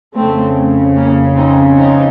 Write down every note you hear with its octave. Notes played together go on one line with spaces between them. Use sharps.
F2 C#3 A3 C4
A#3 C#4
C4 D#4
C4 D#4